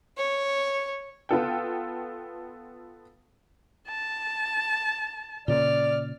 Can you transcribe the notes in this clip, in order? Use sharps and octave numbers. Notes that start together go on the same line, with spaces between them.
C#5
B3 F4 A4 G5
A5
A#2 C#3 D5 F6